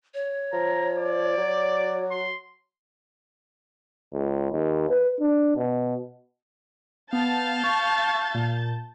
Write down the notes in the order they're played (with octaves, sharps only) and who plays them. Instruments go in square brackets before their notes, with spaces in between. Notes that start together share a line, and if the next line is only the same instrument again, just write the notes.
[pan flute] C#5
[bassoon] F3 [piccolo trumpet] A#5
[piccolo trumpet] D5
[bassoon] F#3
[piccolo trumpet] C6
[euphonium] C#2
D#2
B4
D4
B2
[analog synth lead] B3 [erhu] F5 [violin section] A5 G6 A6
[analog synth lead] C#6
A#2